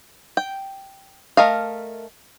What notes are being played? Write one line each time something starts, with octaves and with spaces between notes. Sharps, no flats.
G5
A3 A#4 D#5 F5